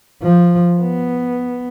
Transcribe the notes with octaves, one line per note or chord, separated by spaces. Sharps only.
F3
B3